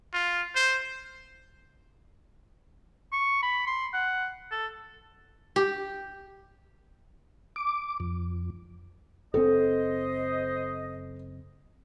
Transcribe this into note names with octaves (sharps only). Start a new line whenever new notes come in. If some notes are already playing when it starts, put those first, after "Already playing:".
F4
C5
C#6
B5
C6
F#5
A4
G4
D6
F2
F#1 C4 A4 C5 D#5